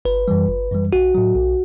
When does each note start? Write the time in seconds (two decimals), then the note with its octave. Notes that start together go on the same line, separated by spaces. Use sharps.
0.05 G1 B4
0.28 F#2 E3 G3
0.49 G1
0.71 F#2 E3 G3
0.93 B1 F#4
1.15 A2 F#3
1.36 B1